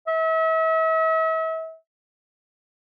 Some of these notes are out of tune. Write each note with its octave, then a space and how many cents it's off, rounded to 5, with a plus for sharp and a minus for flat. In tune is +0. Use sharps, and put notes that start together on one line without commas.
E5 -40